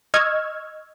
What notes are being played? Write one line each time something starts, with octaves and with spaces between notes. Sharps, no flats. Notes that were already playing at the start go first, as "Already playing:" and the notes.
D#5 C#6 E6 F6 G#6